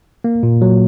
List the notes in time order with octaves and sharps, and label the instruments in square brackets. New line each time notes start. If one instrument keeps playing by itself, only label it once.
[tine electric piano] A#3
A#2
F#3